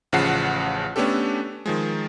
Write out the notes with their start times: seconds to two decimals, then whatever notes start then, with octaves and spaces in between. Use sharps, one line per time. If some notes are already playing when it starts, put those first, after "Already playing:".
0.12 A1 C#3 F3 F#5 A5 C7
0.96 A3 B3 C#4 D4 G4 A4
1.66 D#3 F3 G#3